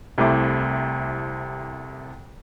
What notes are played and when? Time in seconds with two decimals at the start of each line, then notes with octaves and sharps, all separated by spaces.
0.18 C2 C3 A3 E4 C5 D6